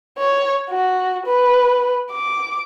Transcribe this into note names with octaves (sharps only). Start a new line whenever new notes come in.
C#5
F#4
B4
D6